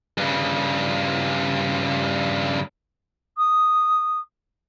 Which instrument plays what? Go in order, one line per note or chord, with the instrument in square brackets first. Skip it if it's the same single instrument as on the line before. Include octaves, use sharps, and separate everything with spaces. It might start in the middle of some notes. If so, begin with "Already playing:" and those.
[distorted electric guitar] G2 C#3
[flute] D#6